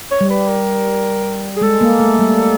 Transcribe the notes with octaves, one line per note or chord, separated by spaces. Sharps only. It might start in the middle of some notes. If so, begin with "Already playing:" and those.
C#5
G3
B4
A#4
G#4
G#3 A4
A#3
A3
G3